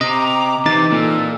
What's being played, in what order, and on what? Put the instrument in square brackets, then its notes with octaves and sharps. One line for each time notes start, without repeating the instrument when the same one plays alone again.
[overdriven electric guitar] C3 [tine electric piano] D#5 [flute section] A#5 D6
[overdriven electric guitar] C3 [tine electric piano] E3 D#4 A6 [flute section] D6
[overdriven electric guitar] A#2 [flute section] A4